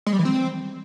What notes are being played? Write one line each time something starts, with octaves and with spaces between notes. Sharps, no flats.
G#3
G3
E3
C4